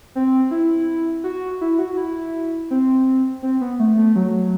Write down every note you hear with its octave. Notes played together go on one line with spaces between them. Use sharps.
C4
E4
F#4
E4
F#4
E4
C4
C4
B3
A3
A3
F#3